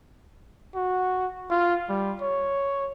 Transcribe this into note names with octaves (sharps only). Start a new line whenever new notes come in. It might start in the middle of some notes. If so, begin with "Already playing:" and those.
F#4
F4
G3
C#5